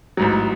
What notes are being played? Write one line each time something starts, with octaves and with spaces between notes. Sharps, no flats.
A1 G#2 F#3